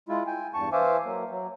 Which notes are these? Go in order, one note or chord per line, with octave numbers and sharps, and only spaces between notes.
G#3 E4 F4
G5 G#5
E2 G2 A5 C#6
E3 C5 E5 F5 G#5 D6
F#3 A#3
F#3